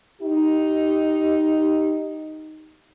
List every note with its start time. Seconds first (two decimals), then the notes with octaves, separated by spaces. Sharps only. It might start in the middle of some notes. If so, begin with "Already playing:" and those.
0.22 D#4 G4